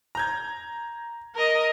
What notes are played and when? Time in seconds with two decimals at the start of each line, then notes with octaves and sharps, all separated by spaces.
0.15 A#5 G6 G#6
1.35 A#4 D#5